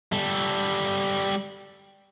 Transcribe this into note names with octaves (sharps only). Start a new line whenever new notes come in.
G3 A4